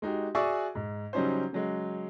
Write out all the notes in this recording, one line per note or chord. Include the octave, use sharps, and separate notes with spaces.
G#3 D#4 F#4 G4
F#4 G#4 D5 E5 G#5 C#6
G#2
C#3 F#3 G3 C#4 D#4 C5
C#3 F#3 G#3